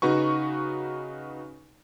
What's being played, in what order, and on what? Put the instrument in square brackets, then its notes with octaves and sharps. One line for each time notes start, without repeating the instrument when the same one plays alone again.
[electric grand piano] C#3 D#4 F#4 B4 C#6